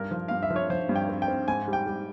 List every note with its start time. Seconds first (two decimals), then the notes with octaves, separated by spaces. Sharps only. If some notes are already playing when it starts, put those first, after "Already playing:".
Already playing: G2 A#4
0.11 F3
0.28 G2 F5
0.43 E5
0.50 F3
0.56 C#5
0.70 F3 C5
0.89 G2
0.96 G5
1.09 C4
1.22 G5
1.28 C4
1.48 G#2 G#5
1.68 G3
1.73 G5
1.87 G3